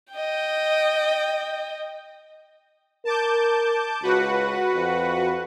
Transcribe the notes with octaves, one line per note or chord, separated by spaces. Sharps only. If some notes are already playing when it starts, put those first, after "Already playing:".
D#5 G5
A#4 A5 D6 G6
C#2 F#4 B4 F#5
F2